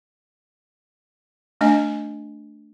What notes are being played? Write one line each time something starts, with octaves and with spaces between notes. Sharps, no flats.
A3 D4 D#5 G#5